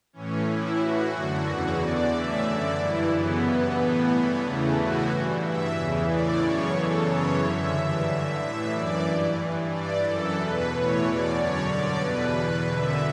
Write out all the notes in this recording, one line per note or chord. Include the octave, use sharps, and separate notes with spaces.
A2 E3 C#4
A2 E3 E4
A2 E3 F#4
F#2 D3
E2 C#3 E3 F#4
E2 D3 D5
A2 E3 E5
F#2 D3 D5
G2 E3 E4
F#2 C#3 E3 B3
G2 E3 B3
A2 E3
G2 E3
E2 C#3 E3 A3
A2 E3 F#4
G2 E3
G2 E3 E5
E2 C#3 E3
A2 E3 D5
F#2 C#3 E3 C#5
E2 C#3 E3 A4
F#2 C#3 E3 C#5
F#2 D3 E5
G2 E3
G2 D3
A2 E3 E5
F#2 E3 D5
G2 E3
G2 E3
G2 E3 D5
F#2 E3 A4
E2 B2 B4
A2 E3 C#5
E2 B2 D5
F#2 D3 C#5
G2 D3 D5
E2 B2 B4
E2 B2
F#2 D3 E5